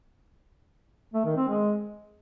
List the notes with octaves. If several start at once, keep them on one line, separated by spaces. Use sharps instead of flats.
A3
D#3
C4
G#3